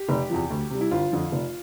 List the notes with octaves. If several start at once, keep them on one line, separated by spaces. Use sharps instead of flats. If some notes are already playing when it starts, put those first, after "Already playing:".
Already playing: G4
F1
E2 C3 F3
D2
C3 G3
E4
G1 F4
F2 D3 F3
F1